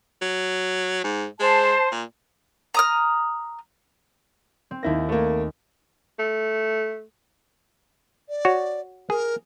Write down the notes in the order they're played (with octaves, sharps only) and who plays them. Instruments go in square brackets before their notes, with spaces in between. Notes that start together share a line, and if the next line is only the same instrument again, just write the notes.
[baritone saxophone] F#3
G#2
[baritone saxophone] G#3 [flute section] C5 A5
[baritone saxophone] A#2
[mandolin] A#5 D#6 F6
[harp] C4
[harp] D#2 A#6 [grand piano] A#3 E4
[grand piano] A3 A#3
[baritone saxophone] A3
[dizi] D5
[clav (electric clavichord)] F#4 C#5
[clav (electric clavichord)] G#4 [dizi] A#4